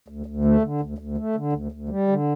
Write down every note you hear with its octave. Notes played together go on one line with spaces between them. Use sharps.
D2
D2
A3
D3
D2
D2
A3
D3
D2
D2
G3
D3